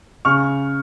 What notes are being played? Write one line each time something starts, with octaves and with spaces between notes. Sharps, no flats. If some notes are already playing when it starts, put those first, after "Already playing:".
C#3 C#6 F6